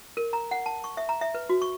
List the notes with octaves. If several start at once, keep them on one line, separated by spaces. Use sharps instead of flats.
A#4
A#5
F#5
A5
C#6
E5
A#5
E5
B4
F#4
C#6